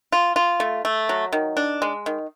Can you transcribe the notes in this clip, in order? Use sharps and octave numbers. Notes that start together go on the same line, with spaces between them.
F4
F4
A3
A3
F#3
D#3
D4
G#3
D#3